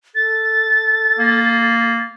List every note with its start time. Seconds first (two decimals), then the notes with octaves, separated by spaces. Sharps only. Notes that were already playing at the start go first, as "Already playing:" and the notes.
0.15 A4 A6
1.19 A#3